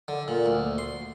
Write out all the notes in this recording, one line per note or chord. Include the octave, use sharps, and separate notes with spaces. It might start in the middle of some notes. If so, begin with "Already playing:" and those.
D3
A#2
D2
C6